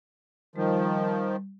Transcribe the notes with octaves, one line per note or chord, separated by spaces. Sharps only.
D#3 F3 G3